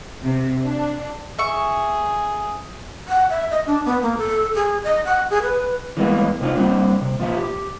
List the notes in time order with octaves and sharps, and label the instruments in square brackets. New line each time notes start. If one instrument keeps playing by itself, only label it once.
[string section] C3
D4
[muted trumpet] G#4 [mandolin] E5 C#6
[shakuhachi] F#5
E5
D#5
D4
B3
A#3
A4
G#4
D#5
F#5
G#4
B4
[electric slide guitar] E3 G3 G#3 A#3 B3
C3 D4 D#4 F4
G3 A#3 C4 D4
C3
A#2 F3 E5
G4